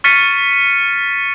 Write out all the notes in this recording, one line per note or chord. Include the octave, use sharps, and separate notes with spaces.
C#6 F6 A6 B6 C#7 D#7